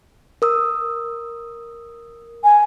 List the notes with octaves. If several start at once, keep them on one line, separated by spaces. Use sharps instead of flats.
A#4 D#6 E6
G#5